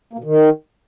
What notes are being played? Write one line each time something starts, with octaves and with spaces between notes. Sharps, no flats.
A#3
B2
D#3